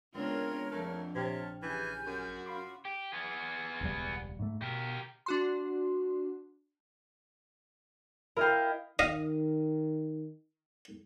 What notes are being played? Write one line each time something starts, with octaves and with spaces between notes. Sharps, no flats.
C#3 G#3 B3 C4 D4 F4 A#4 C#5
F2 D3 A3
A#1 C3 G4 C#5 A5 F6
C#3 E3 G#5 G6
F#2 C#4 F#4
F4 B5 C6 D6
G4
B3 G#4
E1 C#2 G3
G#2 A3
B2 G4 A#4
D4 F#4 C6
E4 A#4 D#5 F5 G5
D#3 D#5 F5